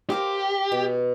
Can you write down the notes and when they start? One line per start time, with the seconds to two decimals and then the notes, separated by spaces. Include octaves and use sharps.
0.10 G4 A#4 C5 F5
0.72 B2